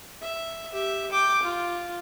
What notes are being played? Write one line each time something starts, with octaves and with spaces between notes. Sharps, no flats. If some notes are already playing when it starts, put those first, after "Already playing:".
E5
G4 E5
G5 D6
F4